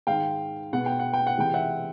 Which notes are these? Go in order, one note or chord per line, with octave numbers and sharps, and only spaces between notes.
G#2 D#3 G#3 F5 G5
B2 G#3 B3 F#5
G5
F#5
G5
F#5
C3 E3 G#3 G5
E5 F#5